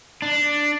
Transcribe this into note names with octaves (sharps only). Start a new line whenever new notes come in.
D4